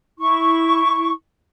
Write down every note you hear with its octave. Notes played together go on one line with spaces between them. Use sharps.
E4 C#6